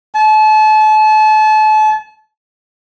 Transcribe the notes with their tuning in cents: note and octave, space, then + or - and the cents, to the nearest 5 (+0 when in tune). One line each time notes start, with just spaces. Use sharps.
A5 -35